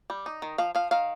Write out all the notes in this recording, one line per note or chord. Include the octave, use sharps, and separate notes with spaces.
G3
D#4
D#3
F3 F5
F3 F5
D#3 F5